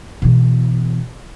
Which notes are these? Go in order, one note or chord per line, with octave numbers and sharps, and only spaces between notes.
B2 E3